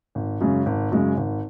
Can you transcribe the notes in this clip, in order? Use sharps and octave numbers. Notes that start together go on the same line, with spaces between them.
G#1
F#2 C#3 G#3
G#1
F#2 C#3 G#3
G#1